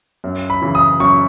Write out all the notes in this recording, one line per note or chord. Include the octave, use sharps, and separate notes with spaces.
F#2
B5
C#3 E3
D#6
F#2 C#6